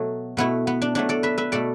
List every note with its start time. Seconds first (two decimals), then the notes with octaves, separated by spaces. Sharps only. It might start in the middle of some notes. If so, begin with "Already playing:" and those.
Already playing: B2 F#3 A3
0.37 B2 A3 B3 E4
0.67 B3
0.82 D4
0.95 B2 F#3 A3 D4
1.09 A4 D5
1.23 B4 E5
1.38 B4 E5
1.52 B2 A3 A4 D5